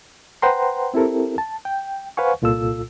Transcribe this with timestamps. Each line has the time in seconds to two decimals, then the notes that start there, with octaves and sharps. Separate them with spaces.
0.42 B4 C5 F#5 G5 A#5 C6
0.94 C4 E4 G4 A4 A#4
1.38 A5
1.65 G5
2.17 B4 C5 F5 F#5 G#5 C#6
2.42 C2 A#2 F4 A4 E6